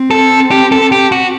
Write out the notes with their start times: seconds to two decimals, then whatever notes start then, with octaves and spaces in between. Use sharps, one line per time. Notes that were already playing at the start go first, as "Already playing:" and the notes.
Already playing: C4
0.11 A4
0.51 G4
0.72 A4
0.92 G4
1.12 F#4